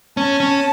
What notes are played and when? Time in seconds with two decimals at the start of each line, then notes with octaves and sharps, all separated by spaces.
0.17 C#4 A5
0.40 C#4